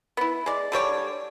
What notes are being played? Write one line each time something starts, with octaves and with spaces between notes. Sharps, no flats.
B3 E4
G#3 D5
D3 G3 C#5 D5